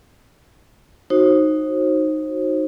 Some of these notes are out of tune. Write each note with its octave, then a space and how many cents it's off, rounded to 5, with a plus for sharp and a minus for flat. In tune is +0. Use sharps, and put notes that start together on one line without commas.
D#4 +0 F#4 +0 C5 +30